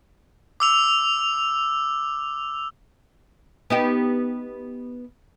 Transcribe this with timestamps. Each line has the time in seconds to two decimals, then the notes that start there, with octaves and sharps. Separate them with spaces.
0.60 D6 E6 F7
3.70 B3 D#4 G4